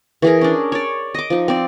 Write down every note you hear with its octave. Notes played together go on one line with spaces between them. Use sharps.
E3 G#4 A#4
C#4 D4
C#5 D5
D#5 D6
F3 D#4
C4 D5